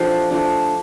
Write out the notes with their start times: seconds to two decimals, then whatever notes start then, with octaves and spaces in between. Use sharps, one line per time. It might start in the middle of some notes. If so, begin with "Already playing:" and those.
Already playing: F3 A3 D4 G4
0.31 F3 A3 D4